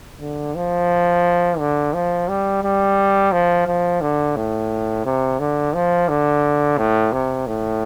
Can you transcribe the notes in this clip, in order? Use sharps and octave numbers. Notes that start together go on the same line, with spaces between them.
D3
F3
D3
F3
G3
G3
F3
F3
D3
A2
C3
D3
F3
D3
A2
C3
A2